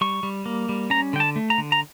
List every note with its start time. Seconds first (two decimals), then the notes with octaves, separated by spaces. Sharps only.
0.01 G3 C#6
0.23 G3
0.46 A#3
0.69 G3
0.90 C#4 A#5
1.13 D3 G5
1.20 A5
1.36 A3
1.50 A#5
1.58 D3
1.72 A#5